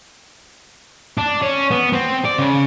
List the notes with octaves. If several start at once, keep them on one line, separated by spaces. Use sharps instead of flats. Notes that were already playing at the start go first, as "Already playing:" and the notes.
D4
C#4
B3
C4
D5
C#3